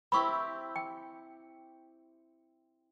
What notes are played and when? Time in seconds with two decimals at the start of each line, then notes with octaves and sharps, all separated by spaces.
0.12 C4 E4 G4 B5 C#6
0.76 G5